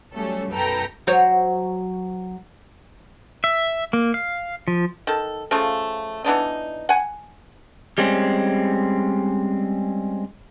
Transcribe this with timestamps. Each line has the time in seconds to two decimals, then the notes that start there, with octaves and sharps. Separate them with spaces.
0.13 F#3 G3 A3 C#4 A4
0.50 B1 F#2 A4 B4 G5 A#5
1.07 F#3 C5 C#5
3.44 E5
3.93 A#3
4.14 F5
4.68 F3
5.07 D#3 A4
5.51 C#3 F3 A3
6.24 E3 B3 D4 D#4
6.89 F#5 G#5
7.98 G3 G#3 C4 C#4